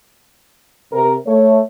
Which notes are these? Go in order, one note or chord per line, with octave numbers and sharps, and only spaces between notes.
C3 A#4
A3 C#5